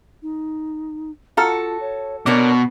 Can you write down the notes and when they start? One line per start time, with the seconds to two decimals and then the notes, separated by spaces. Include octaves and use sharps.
0.23 D#4
1.37 F4 F#4 A4 F5 A#5 F6
1.81 C#5
2.26 B2 B3 D4 A#4 C#5 D5 D6